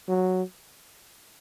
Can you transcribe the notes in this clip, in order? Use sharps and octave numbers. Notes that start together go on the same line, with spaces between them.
F#3